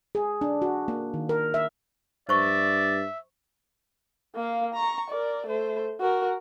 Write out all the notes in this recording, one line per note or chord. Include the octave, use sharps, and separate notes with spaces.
G#4
D4
F#4
A#3
D#3
A#4
E5
G2 C5 D5 E5 C#6
A#3 F5
A#5 C#6
A#4 D5
A3 C5
F#4 A#4